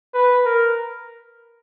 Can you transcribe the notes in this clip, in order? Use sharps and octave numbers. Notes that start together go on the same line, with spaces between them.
B4
A#4